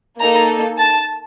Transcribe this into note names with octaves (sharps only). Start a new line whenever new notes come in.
A#3 D#4 A4 A#5
A5